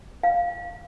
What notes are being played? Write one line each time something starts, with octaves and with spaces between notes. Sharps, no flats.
F5